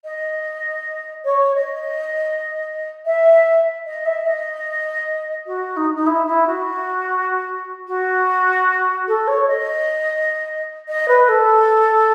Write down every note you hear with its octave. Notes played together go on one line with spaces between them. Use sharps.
D#5
C#5
D#5
E5
D#5
E5
D#5
F#4
D#4
D#4
E4
E4
F#4
F#4
A4
C#5
D#5
D#5
B4
A4